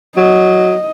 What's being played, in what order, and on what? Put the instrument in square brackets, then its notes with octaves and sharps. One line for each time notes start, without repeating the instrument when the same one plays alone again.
[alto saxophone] F#3 [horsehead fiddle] D#5